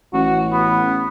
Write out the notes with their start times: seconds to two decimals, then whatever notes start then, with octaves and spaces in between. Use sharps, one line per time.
0.13 A1 F#4
0.52 B3